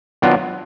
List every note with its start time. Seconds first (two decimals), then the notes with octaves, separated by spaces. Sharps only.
0.22 D#3 F#3 B3 D4 F4